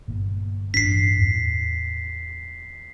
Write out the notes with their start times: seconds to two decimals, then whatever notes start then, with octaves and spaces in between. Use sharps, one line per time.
0.08 G1 A#2
0.74 A1 G2 D4 B6 C7
1.17 E2 A2